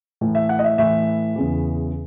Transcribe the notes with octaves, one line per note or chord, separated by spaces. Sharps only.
A2 E3
E5
F#5
D#5
E5
A2 E3 E5
E2 C#3 E3